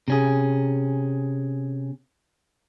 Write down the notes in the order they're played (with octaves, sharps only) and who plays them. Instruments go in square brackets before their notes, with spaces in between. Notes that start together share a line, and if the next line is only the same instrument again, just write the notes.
[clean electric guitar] C3 C#4 G#4